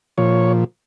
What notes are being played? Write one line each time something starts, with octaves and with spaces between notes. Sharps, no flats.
A#2 F3 C#5